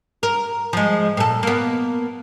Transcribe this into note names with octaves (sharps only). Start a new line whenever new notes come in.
A#4
F3 G#3
A#2 A4
A#3 B3